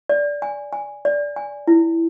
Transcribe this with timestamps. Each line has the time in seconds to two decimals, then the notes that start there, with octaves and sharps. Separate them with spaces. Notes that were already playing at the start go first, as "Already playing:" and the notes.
0.09 D5
0.42 G#5
0.73 G#5
1.05 D5
1.36 G#5
1.67 E4